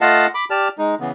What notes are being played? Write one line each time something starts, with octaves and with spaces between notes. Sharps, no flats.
A3 F4 D#5 F5 F#5 A5
B5 D6
G4 D5 A5 F6
G#3 D#4
C#3 E3 B3